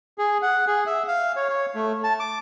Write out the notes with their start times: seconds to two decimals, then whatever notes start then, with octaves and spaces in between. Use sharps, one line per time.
0.18 G#4
0.42 F#5
0.67 G#4
0.87 E5
1.08 F5
1.36 C#5
1.49 C#5
1.75 A3
2.04 A5
2.20 D6